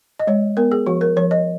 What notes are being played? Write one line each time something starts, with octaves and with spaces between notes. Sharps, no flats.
D#5
G#3 C#5
B3 A#4
G#4
F3 F#4
A#4
F3 C#5
D#5